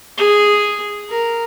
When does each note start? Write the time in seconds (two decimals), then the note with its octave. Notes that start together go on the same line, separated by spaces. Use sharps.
0.18 G#4
1.10 A#4